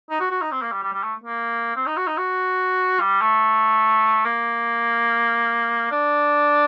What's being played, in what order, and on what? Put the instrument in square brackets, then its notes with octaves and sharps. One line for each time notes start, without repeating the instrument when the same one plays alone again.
[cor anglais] D#4
F#4
F#4
D#4
C4
A#3
G3
G3
G3
A3
A#3
C4
D#4
F#4
D#4
F#4
G3
A3
A#3
D4